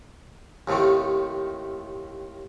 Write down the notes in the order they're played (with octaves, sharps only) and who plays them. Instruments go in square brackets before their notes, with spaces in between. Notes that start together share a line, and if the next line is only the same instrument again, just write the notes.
[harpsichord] D#2 A2 C3 D#3 A3